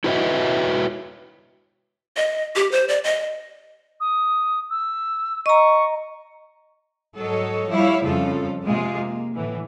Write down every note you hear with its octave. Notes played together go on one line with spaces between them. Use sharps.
E4 F#4 B4 C#5 D#5 E5
D#5
G4
C5
D5
D#5
D#6
E6
D#5 A#5 C#6
G#2 F#3 A4 C#5 D#5
F3 G3 E4 C#5 F5
F2 C#3 F3 G3 F4 A4
C3 G#3 A#3 F4 G#4
A#3
A2 D3 E3